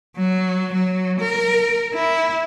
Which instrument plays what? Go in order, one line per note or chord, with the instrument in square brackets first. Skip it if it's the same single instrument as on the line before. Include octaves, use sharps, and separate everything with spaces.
[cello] F#3
F#3
A#4
E4